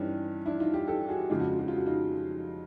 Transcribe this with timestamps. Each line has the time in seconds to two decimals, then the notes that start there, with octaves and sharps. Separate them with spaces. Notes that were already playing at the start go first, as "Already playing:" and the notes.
Already playing: G2 E3 G3 C#4 D#4
0.46 D4 E4
0.60 D#4 F4
0.74 F4 G4
0.88 G4 A4
1.09 F#4 G#4
1.29 F2 C#3 F3 G#3 F4
1.40 F#4
1.48 F4
1.59 F#4
1.68 F4
1.76 F#4
1.86 D#4 F4